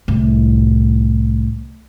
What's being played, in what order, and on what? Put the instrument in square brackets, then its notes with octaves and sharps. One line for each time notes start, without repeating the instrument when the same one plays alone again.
[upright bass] C2 A2